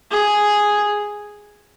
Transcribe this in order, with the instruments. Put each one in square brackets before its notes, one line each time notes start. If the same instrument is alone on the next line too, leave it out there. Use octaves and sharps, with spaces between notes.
[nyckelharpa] G#4